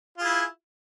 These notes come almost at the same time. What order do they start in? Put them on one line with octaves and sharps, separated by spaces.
F4 G#4 E4